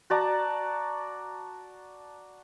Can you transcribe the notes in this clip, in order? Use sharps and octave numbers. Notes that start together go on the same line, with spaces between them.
F#4 D5 A5 A#5